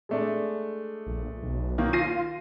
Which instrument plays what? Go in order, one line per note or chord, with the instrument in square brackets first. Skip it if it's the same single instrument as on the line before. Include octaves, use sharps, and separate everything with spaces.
[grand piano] G#3 A3 D4
[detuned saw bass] A#1
B1
[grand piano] D#3 A#3
[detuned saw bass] F4 [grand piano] A#6 C7 D#7